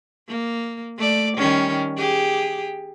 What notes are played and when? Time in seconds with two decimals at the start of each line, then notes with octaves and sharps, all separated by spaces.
0.29 A#3
0.97 A3 D5
1.37 D#3 G3 C#4
1.97 G4 G#4